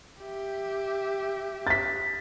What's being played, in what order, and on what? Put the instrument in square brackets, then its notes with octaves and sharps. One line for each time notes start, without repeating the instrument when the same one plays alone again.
[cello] G4 E5
[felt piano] A6 B6